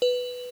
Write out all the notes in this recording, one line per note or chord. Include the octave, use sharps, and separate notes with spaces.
B4